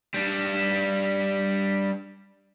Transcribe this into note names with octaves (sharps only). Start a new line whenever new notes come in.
G3 D4